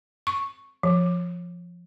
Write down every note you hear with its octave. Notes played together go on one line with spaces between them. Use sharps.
C#6
F3